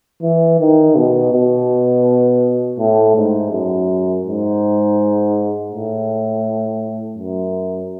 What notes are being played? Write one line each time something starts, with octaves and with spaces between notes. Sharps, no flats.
E3
D#3
B2
B2
A2
G#2
F#2
G#2
A2
F#2